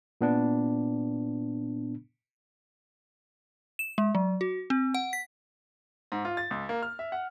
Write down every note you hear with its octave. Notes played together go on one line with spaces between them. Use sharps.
A#2 B3 D4
E7
G#3
F#3
F#4
C4
F#5
B6
G#2
F4
A6
C#2
A#3
F6
E5
F#5